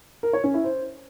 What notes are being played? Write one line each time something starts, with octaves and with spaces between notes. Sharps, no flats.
A#4
C#5
C#4
E4
C5